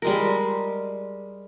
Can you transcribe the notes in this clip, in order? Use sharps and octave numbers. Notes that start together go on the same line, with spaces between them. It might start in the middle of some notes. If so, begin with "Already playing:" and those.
G3 G#3 A#4